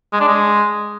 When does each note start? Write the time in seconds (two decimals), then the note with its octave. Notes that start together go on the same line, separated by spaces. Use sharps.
0.13 G#3
0.21 D4
0.28 G#3